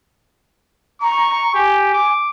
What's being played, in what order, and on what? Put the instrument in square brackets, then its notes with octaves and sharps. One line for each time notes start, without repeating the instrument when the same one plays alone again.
[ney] A#5 [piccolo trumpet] C#6
[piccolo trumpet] G4 [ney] G#5
[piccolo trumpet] D6